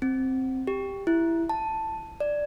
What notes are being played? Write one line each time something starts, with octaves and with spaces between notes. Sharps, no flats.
C4
G4
E4
A5
D5